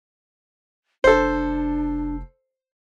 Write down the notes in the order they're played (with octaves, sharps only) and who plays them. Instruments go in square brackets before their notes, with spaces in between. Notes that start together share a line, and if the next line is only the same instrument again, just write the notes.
[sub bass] F1 [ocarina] D4 [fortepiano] A4 C5